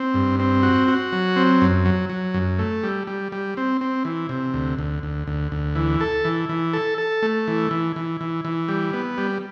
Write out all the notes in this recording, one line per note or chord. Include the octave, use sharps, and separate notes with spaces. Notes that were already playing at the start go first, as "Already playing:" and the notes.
Already playing: C4
G2
C4
F#4
F#4
F#3
C4
F#2
F#3
F#3
F#2
A3
G3
G3
G3
C4
C4
E3
C3
D2
D2
D2
D2
D2
E3
A4
E3
E3
A4
A4
A3
E3
E3
E3
E3
E3
G3
B3
G3